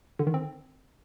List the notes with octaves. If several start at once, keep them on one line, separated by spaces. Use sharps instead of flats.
D3
D#3
C4